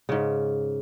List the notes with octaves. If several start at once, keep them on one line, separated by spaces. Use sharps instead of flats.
G#2 C#3